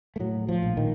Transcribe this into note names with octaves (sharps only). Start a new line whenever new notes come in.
A3
A2 F#3
F3
A#1
D#3